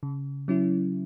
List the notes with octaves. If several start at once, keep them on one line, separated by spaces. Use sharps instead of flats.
C#3
F#3 C#4 E4